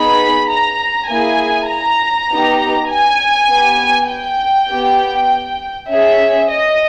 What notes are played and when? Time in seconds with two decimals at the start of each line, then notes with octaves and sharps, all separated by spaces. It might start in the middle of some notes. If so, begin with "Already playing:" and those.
Already playing: B3 D#4 G#4 B5
0.49 A#5
1.09 A#3 E4 G#4 G#5
1.69 A#5
2.30 B3 D#4 G4
2.89 G#5
3.49 B3 G4
4.10 G5
4.70 B3 G4
5.90 C#4 G#4 E5
6.50 D#5